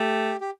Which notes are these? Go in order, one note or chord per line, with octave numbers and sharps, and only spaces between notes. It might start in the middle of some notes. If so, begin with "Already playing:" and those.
Already playing: A3 G4
G4